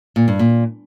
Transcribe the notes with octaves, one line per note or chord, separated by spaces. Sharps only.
A#2
G2
A#2